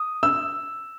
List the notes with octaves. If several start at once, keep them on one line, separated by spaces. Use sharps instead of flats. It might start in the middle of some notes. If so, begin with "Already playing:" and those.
Already playing: D#6
E6